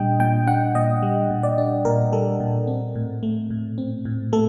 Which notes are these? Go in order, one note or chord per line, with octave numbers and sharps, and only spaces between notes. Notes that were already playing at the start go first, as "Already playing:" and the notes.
Already playing: A#2 G3 D4 D#5 G5
A#2 G5
D4 F#5
A#2 D#5
G3
A#2
D5
D4
A#2 A#4
G3 A4
A#2
C4
A2
A3
A2
C4
A2
A3 A4